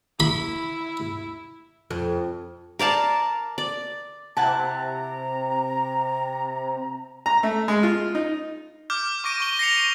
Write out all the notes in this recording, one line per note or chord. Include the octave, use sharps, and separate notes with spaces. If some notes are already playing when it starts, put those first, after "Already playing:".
E4 B5
F2
A#4 D5 F5 A5
D5
C3 E4 F#5 A5 A#5
A#5
A3
G#3
F4
D#4
D6 F6 G6
C#6 D6 A#6 D7 D#7
C#6 G7
A#6 C7 C#7 F7